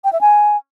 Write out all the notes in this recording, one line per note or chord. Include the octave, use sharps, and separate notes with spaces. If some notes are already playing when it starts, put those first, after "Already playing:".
G5
E5
G#5